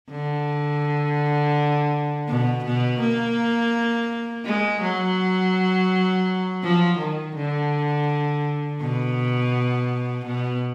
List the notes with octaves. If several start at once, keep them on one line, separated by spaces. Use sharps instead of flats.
D3
B2
B2
A#3
G#3
F#3
F3
D#3
D3
B2
B2